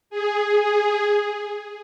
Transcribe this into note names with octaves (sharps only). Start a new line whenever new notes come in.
G#4
G#4